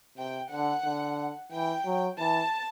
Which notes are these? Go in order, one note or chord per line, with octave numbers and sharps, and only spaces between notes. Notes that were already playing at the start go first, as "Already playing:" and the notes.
C3 G5
D3 F#5
D3
E3 G5
F#3
E3 A5